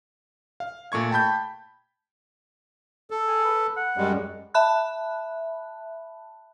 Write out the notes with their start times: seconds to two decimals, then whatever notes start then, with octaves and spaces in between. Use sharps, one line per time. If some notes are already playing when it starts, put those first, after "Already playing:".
0.60 F5
0.92 A#2 A3 C#6 G#6
1.11 G5 A5 B5 G6
3.10 A4
3.27 G#4
3.45 B4
3.77 F#5
3.97 F#2 G3 G#3
4.54 E5 A5 B5 F#6